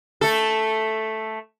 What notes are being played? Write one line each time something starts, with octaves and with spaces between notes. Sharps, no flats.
A3 A4